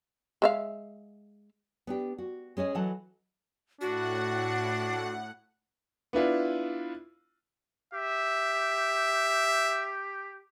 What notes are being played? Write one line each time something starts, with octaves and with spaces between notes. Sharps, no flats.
G#3 E5 F5
B3 D4 G4
F#4
G#3 C#4 G#4 D#5
E3 F#3 A4 D#5 F#5 A5
A2 D4 F#4 F#5
B3 D4 E4 F4
G4 E5